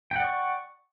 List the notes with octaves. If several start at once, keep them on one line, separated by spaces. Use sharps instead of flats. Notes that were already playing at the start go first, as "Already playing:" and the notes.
D5 F#5 G5 C#6